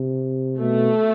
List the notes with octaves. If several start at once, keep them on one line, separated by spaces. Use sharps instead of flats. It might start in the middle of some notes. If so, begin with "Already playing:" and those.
Already playing: C3
B2 A3